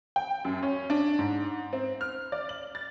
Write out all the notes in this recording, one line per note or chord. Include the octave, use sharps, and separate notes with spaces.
G5
F#2
C#4
D4
G#2
C4
F6
D5
F#7
A6